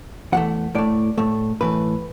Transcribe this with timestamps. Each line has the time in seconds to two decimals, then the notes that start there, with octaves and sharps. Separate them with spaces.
0.32 E2 E3 A3 F#5
0.75 A2 A3 D5
1.18 A2 A3
1.61 A2 E3 A3 B4